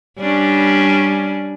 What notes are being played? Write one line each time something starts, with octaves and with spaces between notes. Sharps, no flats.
G3 C#4 D4